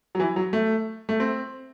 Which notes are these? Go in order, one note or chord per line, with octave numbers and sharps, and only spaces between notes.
F#3
E3
F#3
A3
A3
C4